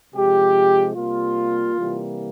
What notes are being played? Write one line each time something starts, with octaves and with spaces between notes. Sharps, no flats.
C3 F3 G#3 G4
C3 G3 A#3 F4
C3 E3 G3 A#3